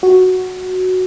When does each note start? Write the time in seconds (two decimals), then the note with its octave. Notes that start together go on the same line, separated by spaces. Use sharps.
0.03 F#4